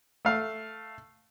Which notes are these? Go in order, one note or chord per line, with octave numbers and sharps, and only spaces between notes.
A3 F5